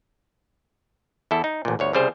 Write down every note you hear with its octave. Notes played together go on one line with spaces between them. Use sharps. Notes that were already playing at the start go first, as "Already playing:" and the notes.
E2 E4 A4
D#4
A1 A#2
G1 D2 C#5
C2 C#3 G3 G#4 C5